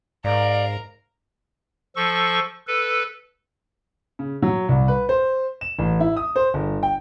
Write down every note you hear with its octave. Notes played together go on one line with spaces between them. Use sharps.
G#2 A#4 D5 F5 A#5
F3 A4 C#6
A4 B4
C#3
F#3
C2
B4
C5
E7
A1
E4
D#6
C5
G1
G5